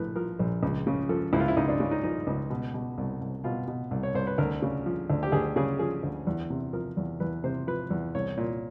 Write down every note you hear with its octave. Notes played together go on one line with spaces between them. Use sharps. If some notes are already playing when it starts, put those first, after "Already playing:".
Already playing: A#1 A2 B4
F3 A#4
A#1
C#2
C#3
F3 A4
C#2 E4
F4
E4
C#2 D#4
D4
C#3
D#4
F3 D#4
C#2
B2
B2
C2
C2
B2 F4
B2
C2
C#5
C2 C5
B4
D2 A#4
C#3
F3
D2
G4
D2 G#4
C#3 G#4
F3 G#4
D2
E2
C3
F3 A#4
E2
E2 B4
C3 C5
F3 B4
E2
C2 C#5
A#2